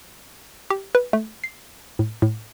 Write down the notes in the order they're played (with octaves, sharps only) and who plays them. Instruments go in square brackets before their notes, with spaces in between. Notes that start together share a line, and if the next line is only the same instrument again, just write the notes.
[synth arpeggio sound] G4
B4
A3
C7
A2
A2